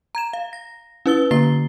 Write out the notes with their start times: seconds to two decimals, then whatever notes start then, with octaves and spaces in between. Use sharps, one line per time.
0.15 A#5 G#6 E7
0.33 F5
0.53 A#6
1.06 C#4 E4 B4 E6 A6 G7
1.31 D3 A#3 A#5 A6 C7 G7